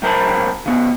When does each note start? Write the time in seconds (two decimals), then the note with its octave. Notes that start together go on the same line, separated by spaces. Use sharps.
0.02 C#2 F#2 A#4 C5 A5 B5
0.66 C#3 B3